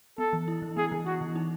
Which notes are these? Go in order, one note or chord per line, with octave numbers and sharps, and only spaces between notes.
B3 A4
E3
E4
E3
B3 G#4
E3
E4 F#4
E3
D#4